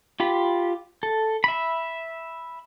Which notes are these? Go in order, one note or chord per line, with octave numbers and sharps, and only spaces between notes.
F4 G4 B5
A4
E5 B5